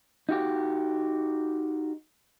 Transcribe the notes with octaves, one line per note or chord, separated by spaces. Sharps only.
D#4 F#4 G4